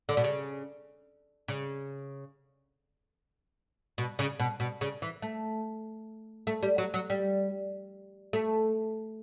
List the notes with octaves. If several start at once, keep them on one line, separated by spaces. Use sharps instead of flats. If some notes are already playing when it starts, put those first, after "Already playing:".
D3
B2
C#3
C#3
B2
C#3
B2
B2
C#3
E3
A3
A3
G3
F#3
F#3
G3
A3